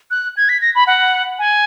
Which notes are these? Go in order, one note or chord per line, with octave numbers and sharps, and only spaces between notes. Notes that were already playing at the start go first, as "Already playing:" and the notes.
F#6
G#6
B6
A#6
B5
F#5
G#5